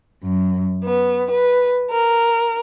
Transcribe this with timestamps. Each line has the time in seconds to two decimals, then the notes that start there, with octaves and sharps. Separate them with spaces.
0.22 F#2
0.83 B3
1.30 B4
1.89 A#4